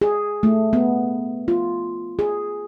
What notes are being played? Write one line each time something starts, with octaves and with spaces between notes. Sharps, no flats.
G#4
A3
B3
F4
G#4